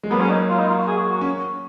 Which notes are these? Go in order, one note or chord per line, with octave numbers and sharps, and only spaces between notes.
G#3
F#3 A#3 B3
C#4
D#4
F4
D#4
F4
F#4
G#4
F#4
F#4
C#4